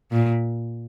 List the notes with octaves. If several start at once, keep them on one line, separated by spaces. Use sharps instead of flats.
A#2